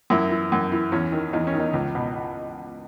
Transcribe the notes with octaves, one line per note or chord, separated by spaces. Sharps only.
F#2 E4
E3
F#2
E3
E2 C#4
D#3
E2 D#4
C#4
D#3
D#4
C#2
B2